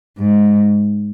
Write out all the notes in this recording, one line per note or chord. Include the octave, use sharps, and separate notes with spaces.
G#2